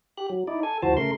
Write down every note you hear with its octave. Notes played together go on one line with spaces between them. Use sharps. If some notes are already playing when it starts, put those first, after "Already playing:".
G4 F#6
F#3
D#4 E4 D5
A4 G#5
D2 E3 F3 F#4 C5 A5
C#3 A3 A#4 C6